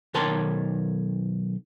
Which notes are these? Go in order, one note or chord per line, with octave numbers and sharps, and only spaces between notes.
B1 D#3 A#4 C#5 A5 C6